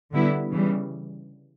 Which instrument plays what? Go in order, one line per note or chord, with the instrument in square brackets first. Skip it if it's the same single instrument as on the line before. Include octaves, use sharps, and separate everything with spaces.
[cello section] D3 G3 B3 E4
C#3 E3 G3